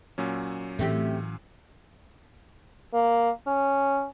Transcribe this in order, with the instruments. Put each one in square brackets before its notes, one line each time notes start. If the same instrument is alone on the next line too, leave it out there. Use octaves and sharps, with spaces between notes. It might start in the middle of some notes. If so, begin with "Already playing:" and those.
[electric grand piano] A#2 F#3 C#4
[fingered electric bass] A2 E3 [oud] A3 C4 G4
[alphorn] A#3
C#4